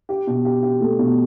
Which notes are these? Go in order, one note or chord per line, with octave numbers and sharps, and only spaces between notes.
G4
B2
G4
G4
A3
B2